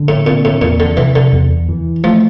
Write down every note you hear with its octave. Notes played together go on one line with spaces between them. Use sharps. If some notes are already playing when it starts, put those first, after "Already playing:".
Already playing: D3
A2
A#2 C4
A2
E2 A#2
D3
C3 E3
D3
E2
E3
F3 A3